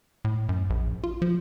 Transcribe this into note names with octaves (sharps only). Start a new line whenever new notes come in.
A2
F#2
A#1
F4
F3